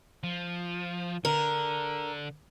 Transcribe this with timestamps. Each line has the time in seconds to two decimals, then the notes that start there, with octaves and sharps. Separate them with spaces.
0.24 F3
1.25 D3 A#4